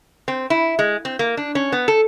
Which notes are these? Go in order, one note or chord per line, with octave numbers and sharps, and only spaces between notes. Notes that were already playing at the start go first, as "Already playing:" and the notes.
C4
E4
G#3
C4
A#3
D4
C#4
B3
A4